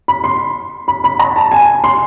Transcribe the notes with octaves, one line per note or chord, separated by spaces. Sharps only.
B5
C6
B5
B5
A#5
A5
G#5
C6